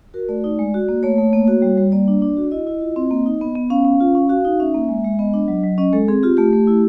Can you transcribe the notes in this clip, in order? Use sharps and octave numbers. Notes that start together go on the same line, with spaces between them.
F#4 A#4
A3 D5
D#4 D5
G#3
F#4
A#3
A3 C#5
A3
A#3
F#4
G3
G3
A#3 D5
D4
D4
F#4
E4 D#5
E4
F4
C4
A#3
D#4
B3
B3
C#4 F5
C#4
F4
C#4
F#4 F5
D#4
C#4 E5
A#3
G#3
G#3
B3 D#5
D4
F#3
F#3
C#4 D#5
G#3 A4
C4 G#4
F4 G4
A3 G4
A3
E4